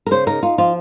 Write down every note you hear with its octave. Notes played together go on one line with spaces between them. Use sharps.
A#4
C#3 C5
D#4 A#4
D#4 F4
F3 F4